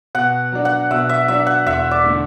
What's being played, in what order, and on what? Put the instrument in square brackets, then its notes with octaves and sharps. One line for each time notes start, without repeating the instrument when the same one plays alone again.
[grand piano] B2 [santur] F#5
[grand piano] F#3 D4
[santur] F#5
[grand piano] B2 [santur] E5
[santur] E5
[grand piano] F#3 D4 [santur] E5
[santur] F#5
[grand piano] E1 [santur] E5
[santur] D5
[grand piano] D3 A3